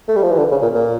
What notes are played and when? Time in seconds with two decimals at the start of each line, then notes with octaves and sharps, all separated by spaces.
0.08 A3
0.16 G3
0.23 F3
0.31 E3
0.38 D3
0.51 C#3
0.62 A#2
0.75 A#2